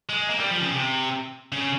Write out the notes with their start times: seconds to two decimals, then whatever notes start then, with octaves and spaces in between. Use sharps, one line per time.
0.09 G#3
0.30 A#3
0.40 G3
0.51 F3
0.60 C#3
0.71 C3
1.52 C#3